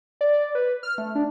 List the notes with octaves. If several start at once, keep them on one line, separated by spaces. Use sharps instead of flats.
D5
B4
F6
A3
D4